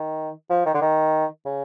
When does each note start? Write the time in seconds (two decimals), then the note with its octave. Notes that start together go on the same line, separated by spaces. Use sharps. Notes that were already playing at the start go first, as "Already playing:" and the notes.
Already playing: D#3
0.50 F3
0.66 D#3
0.74 D3
0.81 D#3
1.45 C#3